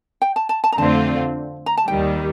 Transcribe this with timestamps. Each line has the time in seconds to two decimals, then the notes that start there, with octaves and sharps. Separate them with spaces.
0.22 G5
0.36 A5
0.49 A5
0.64 A5
0.72 A#5
0.77 F2 D3 A3 C4 F4 A5
1.66 A#5
1.77 A5
1.88 D#2 D#3 G3 G5